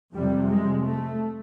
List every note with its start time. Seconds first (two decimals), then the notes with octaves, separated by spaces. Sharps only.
0.13 F2 C3 G3
0.49 G#3
0.84 A3